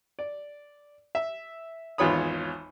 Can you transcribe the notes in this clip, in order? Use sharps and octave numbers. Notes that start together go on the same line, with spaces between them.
D5
E5
G#1 E2 F4 C#5 B5 D#6